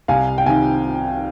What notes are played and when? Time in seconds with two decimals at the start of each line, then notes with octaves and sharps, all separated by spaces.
0.08 C2 F5 G#5
0.38 G5
0.46 C3 D#3 F5 G#5